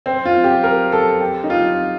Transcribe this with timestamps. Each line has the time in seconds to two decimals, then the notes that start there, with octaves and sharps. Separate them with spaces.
0.06 C4
0.26 F4
0.44 G4
0.64 A#4
0.92 A4
1.20 G4
1.44 D#4
1.50 F4